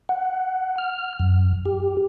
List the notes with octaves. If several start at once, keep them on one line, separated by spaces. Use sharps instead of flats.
F#5
F6
F#2
G4